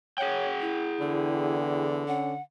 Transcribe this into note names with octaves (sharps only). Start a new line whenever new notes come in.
G#4 C#5 F#5 G5
E4
E2 D3
C#4 F#5